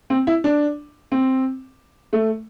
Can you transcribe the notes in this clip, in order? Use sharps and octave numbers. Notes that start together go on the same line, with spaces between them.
C4
E4
D4
C4
A3